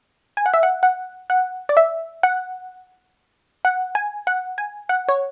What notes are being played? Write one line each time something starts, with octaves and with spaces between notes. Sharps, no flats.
G#5
F#5
E5
F#5
F#5
F#5
D5
E5
F#5
F#5
G#5
F#5
G#5
F#5
C#5